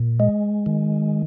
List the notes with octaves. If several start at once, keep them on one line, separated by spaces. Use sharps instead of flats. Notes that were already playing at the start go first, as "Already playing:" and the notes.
Already playing: A#2
G#3
D#3